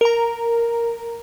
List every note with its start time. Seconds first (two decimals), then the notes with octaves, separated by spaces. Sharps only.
0.01 A#4 A#5